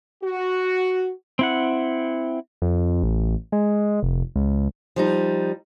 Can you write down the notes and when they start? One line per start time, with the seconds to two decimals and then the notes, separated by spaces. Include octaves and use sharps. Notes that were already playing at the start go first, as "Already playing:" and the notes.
0.24 F#4
1.39 C4 E4 F#5
2.62 F2
3.03 A1
3.52 G#3
4.03 F1
4.36 C#2
4.96 F3 G3 D#4